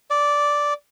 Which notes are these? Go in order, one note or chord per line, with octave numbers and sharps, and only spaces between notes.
D5